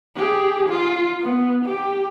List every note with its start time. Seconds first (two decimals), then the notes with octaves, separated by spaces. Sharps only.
0.16 G4 G#4
0.69 F4
1.22 B3
1.65 G4